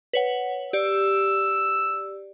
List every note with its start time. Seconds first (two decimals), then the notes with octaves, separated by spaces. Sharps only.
0.13 B4 C#5 F#5
0.73 G4 D5 E6